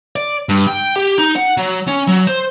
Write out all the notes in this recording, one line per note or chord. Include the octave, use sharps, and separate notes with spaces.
D5
G2
G5
G4
D#4
F#5
F#3
C#4
F#3
C5